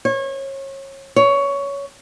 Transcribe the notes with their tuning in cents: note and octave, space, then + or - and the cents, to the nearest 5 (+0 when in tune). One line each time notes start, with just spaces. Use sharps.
C#5 -30
C#5 +15